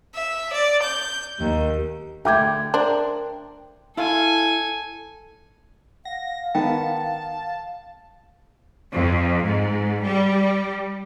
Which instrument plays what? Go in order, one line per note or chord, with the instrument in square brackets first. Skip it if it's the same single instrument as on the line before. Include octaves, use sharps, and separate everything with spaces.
[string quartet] E5
D5
G6
D#2
[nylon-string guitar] D3 A3 [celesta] E5 D6 G#6 [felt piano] G5 G6
[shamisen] D4 C5 [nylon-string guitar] A#4
[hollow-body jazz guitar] E4 F5 [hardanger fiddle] A4 G#5
[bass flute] F5 [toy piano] F#5 [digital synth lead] A#6
[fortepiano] D#3 B3 [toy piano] G5 [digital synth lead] A5
[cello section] F2
G#2
G3